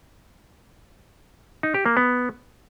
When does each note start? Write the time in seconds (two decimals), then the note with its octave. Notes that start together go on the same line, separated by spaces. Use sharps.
1.63 D#4
1.74 G4
1.86 A#3
1.97 B3